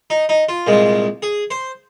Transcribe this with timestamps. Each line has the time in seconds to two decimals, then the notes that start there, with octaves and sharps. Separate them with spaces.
0.10 D#4
0.29 D#4
0.49 F4
0.67 C2 A#2 G#3
1.22 G#4
1.51 C5